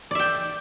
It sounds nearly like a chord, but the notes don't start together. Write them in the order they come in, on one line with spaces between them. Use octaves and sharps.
D5 E5 G5